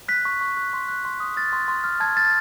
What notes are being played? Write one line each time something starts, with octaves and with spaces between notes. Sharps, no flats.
F#6 B6
C#6
C#6
F#6
C6
F#6
C6
D#6
F6 A6
C6
C6
F6
A5 G#6
F6 A6